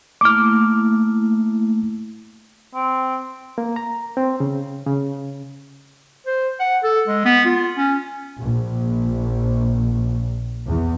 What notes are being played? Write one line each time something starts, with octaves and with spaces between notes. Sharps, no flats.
A3 A#3 E4 D6 F6
C4
A#3
A#5
C4
C#3
C#3
C5
F#5
A4
G#3
B3
F4
C#4
A#1
E2